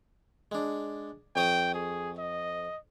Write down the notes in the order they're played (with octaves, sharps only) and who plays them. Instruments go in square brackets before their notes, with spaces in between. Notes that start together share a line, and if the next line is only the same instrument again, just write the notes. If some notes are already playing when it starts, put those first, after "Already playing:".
[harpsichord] G#3 D4
[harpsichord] F2 C#5 D#6 [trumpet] G5
[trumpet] G#4
D#5